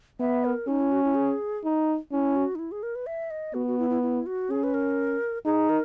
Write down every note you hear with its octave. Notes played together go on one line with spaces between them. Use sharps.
B3 E5
A#4
C#4 D#4
E4
F#4
E4
G#4
D#4
C#4 E4
F#4
D#4
E4
G#4
A#4
B4
E5
D#5
B3 F#4
F#4
E4
E4
E4
F#4
C#4 G#4
B4
A#4
D#4 G#4
A#4